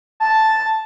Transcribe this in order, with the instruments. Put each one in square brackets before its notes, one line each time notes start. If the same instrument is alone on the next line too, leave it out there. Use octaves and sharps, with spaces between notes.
[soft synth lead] A5